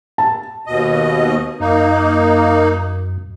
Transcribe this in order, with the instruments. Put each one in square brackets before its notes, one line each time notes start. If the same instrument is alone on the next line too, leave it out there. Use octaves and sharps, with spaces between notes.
[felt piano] A5
[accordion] D#2 B2 D#5
[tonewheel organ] F#2 [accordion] A#3 D#4